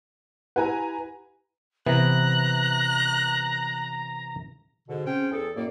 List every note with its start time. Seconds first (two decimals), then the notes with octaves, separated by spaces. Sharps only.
0.56 E4 G4 B4 F#5 G#5 A#5
1.86 C3 E3 B3 A#5 F#6
4.89 G#2 B2 D3
5.06 C4 C#4 G#4 G5
5.32 E2 G#4 A4
5.56 F#2 A2 A#3 D5